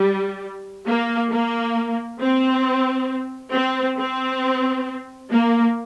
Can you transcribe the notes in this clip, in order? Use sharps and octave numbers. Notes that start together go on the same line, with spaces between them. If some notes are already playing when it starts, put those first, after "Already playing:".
Already playing: G3
A#3
A#3
C4
C4
C4
A#3